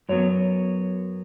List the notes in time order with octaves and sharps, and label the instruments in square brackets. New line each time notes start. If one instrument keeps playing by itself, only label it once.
[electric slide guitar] F#2 F#3 B3 C#5